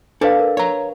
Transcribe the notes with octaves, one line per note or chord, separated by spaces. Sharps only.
D4 A4 B4 D5 F5
A#4
C#5 A#5